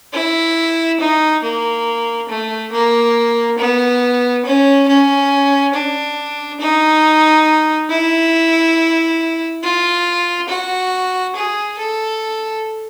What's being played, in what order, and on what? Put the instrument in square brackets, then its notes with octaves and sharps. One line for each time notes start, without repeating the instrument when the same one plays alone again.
[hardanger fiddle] E4
D#4
A#3
A3
A#3
B3
C#4
C#4
D4
D#4
E4
F4
F#4
G#4
A4